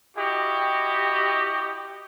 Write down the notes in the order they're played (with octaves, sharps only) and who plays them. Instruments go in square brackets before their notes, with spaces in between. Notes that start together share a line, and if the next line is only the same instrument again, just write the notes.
[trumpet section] E4 F#4 G4 D#5